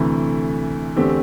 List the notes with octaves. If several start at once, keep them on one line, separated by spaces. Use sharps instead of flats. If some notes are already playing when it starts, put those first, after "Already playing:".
Already playing: D2 C3 E3 A3
E2 D3 A3 C4 G4